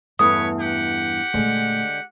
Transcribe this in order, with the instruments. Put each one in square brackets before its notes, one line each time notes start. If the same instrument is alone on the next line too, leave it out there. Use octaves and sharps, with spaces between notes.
[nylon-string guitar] E2 G2 A3 [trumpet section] B4 C#5 [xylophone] D#6
[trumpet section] G4 F#5
[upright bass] A#2 A3 [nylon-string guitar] D3 G#3